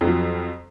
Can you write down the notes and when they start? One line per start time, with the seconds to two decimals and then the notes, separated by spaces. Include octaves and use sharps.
0.01 F2
0.04 F#3
0.07 F3